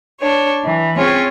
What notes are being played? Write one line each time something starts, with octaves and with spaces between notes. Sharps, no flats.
D4 C#5
E3
C4 C#4 F4 G#4 C#5